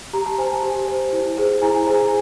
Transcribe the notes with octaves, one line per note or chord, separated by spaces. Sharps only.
G4 A#5
A5
C5 G#5 A#5
G4
C5
E4
G#4 C5
E4 G#5 A#5
G#4 C5 G#5 A#5